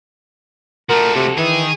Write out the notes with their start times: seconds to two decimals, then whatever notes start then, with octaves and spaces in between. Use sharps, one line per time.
0.89 F3 A3 F#4 A4 A#4
1.16 C3
1.38 D#3 E3 G#4